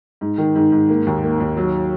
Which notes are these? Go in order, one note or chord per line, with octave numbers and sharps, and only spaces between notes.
G#2
D#3
G#2
G#2
A#3
D#2
A#3
D#2
F#3